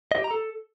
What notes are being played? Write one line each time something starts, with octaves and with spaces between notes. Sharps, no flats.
D#5
G4
A#5
A4